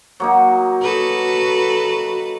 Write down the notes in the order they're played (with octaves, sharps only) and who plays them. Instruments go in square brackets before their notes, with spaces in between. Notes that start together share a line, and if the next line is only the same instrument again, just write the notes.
[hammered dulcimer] F#3 A#3 D#4
[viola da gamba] F#4 A4 B4